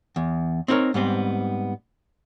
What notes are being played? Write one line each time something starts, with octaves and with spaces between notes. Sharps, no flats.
E2
C4 D#4 E4 A#4 C#5
G#2 G3 B3 C4